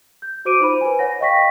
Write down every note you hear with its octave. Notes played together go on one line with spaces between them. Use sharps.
G6
F#4 C5 D6 D7 D#7
D#4 F4 C5 B5
B4 G#5
C#5 F#5 A#6
D#5 F5 G5 C#6 A#6 B6